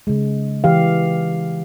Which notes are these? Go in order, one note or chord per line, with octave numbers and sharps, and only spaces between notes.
C#3 G#3
E3 G4 F5